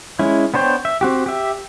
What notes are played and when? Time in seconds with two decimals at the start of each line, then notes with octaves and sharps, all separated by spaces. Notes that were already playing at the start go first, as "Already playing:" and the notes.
0.19 G#3 C#4 E4
0.54 B3 D4 C5 C#5 G5
0.85 E5
1.01 C4 F#4 G4
1.26 G4 E5